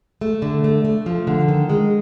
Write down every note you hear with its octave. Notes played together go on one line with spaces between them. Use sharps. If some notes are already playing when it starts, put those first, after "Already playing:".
A3
D3
A3
A3
F3
D3
D#3
G#3